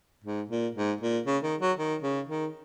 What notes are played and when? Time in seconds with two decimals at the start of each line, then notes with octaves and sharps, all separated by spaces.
0.24 G#2
0.50 A#2
0.75 G#2
1.01 A#2
1.26 C#3
1.43 D#3
1.61 F#3
1.77 D#3
2.03 C#3
2.29 D#3